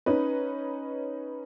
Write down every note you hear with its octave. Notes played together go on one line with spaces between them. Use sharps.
C#4 D#4 B4